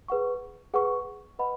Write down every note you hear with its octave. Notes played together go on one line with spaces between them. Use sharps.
G#4 B4 F#5 C#6
G#4 B4 F#5 C#6
B4 D#5 F#5 B5